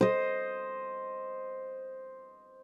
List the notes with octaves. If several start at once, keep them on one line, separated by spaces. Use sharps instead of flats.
C5 D#5